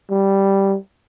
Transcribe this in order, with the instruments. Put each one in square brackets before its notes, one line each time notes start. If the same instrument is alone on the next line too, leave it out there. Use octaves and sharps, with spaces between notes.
[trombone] G3